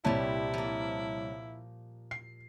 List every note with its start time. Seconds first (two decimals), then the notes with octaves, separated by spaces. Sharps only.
0.05 C2 A#2 G3 E4 C#5 A5
0.54 F3 A#3
2.11 C7